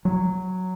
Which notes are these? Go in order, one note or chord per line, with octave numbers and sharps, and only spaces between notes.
F#3